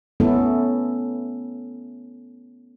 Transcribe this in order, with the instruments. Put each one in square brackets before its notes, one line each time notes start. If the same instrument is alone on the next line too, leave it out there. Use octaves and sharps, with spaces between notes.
[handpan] A3 B3 C#4 E4 A4